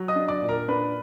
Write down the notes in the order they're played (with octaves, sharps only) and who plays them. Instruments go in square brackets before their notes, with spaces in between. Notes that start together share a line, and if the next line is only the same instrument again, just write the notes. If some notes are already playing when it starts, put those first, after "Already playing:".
Already playing: [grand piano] F#3
D#5 D#6
D4
D5 D6
A#2
A#4 A#5
D4 B4 B5